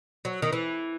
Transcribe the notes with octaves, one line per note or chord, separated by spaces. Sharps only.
F#3
D#3
E3